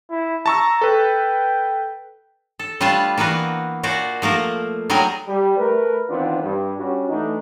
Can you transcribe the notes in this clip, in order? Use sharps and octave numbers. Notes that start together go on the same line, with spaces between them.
E4
A5 A#5 C#6 E6
A4 B4 G5
A4
G3 A3 D4 F4 B4 A5
E3 A#3 B3 F#4 B4
A#2 F#4 C5 D5
F3 A3 A#3 A#4
F#3 G3 G#4 A#4 G#5
G3
A3 A#4 B4
D#3 E3 B3 C4 D4 F4
G2
G3 C#4 D4 F#4
E3 A3 D4 D#4